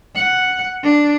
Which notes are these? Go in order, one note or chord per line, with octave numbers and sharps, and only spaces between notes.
F#5
D4